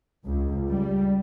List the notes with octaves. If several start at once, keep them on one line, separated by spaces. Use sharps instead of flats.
C#2
G3